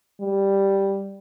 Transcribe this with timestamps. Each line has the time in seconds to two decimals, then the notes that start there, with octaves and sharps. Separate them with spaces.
0.21 G3